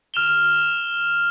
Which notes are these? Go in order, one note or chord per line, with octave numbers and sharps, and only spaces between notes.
F6 E7 F7 G7